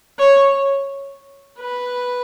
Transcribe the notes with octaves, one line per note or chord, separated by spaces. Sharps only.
C#5
B4